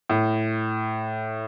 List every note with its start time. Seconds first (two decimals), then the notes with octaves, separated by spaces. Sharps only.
0.10 A2